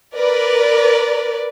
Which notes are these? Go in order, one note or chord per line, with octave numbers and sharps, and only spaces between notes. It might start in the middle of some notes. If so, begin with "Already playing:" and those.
A#4 B4 D5